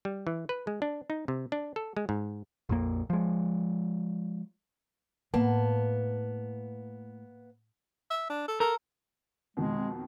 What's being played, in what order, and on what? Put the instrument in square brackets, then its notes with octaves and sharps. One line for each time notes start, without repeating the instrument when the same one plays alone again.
[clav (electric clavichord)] G3
E3
B4
G#3
D4
D#4
C3
D4
A4
G#3
G#2
[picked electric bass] A#1 F2 A#3
F3 G#3
[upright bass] A2 [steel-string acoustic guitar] A#3 B3 A5
[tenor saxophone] E5
D4
A4
[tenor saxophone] A4 [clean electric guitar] A#4
[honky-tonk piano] F2 B2 D#3 [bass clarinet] G#3